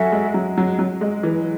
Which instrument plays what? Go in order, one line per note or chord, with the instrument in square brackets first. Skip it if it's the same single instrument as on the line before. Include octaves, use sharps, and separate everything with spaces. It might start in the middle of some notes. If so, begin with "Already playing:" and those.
Already playing: [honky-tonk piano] F#3 [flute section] C#4 F#4 A4 E5
[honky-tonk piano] G#3
F#3
F#3
F#3
G#3
E3